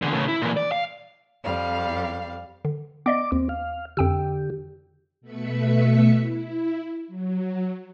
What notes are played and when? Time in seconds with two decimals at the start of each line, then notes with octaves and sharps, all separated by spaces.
0.02 E2 D3
0.14 A2 C#3
0.28 E4
0.41 A#2 E3
0.57 D5
0.72 F5
1.44 F2 G3 F5
2.65 D3
3.06 B3 D5 D#5 D6
3.32 D#2 C4
3.49 F5
3.97 F2 D3 G4 G5 E6
5.21 B2 A3 B4 E5 B5 C#7
6.19 E4
7.08 F#3